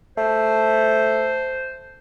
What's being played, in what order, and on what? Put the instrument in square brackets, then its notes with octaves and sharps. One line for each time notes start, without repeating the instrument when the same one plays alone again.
[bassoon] A3 [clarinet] C5